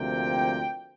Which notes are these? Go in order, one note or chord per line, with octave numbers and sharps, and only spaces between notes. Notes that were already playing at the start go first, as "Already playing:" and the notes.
Already playing: D2 C3 F3 A#3 G5